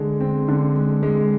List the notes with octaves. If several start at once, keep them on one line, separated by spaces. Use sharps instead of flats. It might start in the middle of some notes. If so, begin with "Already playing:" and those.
Already playing: D3 G#3
C4
D3
G#3
G#3